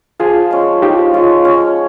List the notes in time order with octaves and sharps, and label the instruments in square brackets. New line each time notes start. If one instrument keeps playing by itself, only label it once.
[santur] F3 [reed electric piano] F4 G#4
[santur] G#3 C#4
[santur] F3 [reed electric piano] D#4 G4
[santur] G#3 C#4 [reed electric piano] F4
[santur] C#4